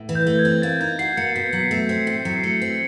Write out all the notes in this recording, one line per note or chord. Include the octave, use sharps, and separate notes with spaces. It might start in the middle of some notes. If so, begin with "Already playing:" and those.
Already playing: A2
E3
G6
A3
G#6
C4
A#3 A6
D#4 G#6
F#4 C7
A#3 C#7
B2 B6
F#3
C7
A3
C4
A2 C7
F#3 C#7
C7
A3 C#7
C4 C7